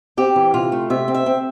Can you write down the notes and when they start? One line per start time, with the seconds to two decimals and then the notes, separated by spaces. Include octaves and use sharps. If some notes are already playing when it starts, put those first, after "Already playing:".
0.17 C4 G4
0.36 E3
0.54 C3 F4
0.72 A3
0.90 C3 E5
1.08 C4
1.14 E5
1.26 C4